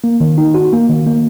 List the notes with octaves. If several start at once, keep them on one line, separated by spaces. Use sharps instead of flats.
A#3
D#3
D#4
F#4
A#3
D#3
A#3